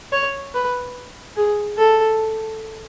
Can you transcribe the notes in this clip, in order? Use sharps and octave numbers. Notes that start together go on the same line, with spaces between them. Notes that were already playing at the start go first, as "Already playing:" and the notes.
C#5
B4
G#4
A4